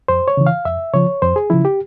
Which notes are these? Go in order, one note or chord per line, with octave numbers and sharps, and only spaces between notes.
F2 C5
C#5
C#3 E3
F5
F2 E5
C#3 F3 C#5
F2 C5
G#4
C#3 F3 E4
G4